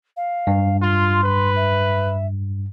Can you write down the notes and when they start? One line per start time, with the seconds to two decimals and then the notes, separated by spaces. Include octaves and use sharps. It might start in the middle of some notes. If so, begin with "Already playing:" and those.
0.17 F5
0.47 G2
0.82 F4 C6
1.24 B4
1.56 E5